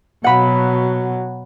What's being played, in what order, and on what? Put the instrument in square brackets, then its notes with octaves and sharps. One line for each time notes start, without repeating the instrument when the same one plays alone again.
[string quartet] B2 F#3 [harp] F#5 B5